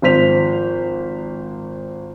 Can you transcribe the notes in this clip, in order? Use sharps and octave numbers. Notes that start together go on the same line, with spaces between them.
G#1 F3 C5 B6 F7